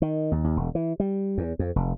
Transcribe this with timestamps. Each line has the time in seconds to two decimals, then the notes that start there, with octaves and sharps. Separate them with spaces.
0.02 D#3
0.32 D#2
0.44 D#2
0.57 E1
0.75 E3
1.00 G3
1.38 E2
1.59 F2
1.76 F1